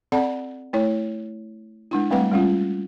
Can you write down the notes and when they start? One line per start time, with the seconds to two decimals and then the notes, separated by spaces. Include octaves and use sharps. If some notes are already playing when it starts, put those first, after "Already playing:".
0.12 C4 A4 D5 F#5 A5 B5
0.73 A3 E4 C#5
1.91 G#3 D4 E4
2.11 G3 A3 C4 B4 D#5 F#5
2.32 G3 G#3 C#4 F4